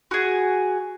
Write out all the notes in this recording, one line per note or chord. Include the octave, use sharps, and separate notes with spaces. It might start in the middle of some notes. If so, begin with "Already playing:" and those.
F#4 G#4